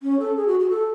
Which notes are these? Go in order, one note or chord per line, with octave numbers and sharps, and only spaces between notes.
C#4
A4
G#4
F#4
F#4
A4